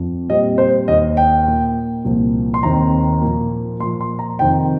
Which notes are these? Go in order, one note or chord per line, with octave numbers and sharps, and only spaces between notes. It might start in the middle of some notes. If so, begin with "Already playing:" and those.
Already playing: F2 F3 C4
A#2 G3 C4 D#5
C5
D#2 D#3 A#3 D#5
G5
A#2 A#3
C2 A#2 F3 A#3
C6
D#2 D#3 C4 A#5
A#2 F3 A#3
A#2 F3 A#3 C6
C6
A#5
F2 C3 D#3 C4 G5